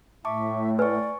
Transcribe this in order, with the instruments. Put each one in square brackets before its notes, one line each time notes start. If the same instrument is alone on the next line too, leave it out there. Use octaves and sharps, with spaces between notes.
[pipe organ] A2 [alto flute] E5 [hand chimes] A5 C#6 D6
[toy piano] B4 [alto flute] D5 [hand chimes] G#5 C#6